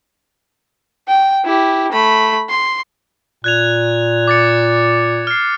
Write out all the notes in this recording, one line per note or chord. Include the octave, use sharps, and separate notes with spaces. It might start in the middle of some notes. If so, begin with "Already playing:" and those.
G5
E4 G4
A3 B5
C6
A#2 F#6 G#6 F7
D6 A6 C#7
F6 C7